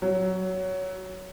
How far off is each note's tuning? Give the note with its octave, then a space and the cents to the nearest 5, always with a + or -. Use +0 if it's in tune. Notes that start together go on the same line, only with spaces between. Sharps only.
F#3 +10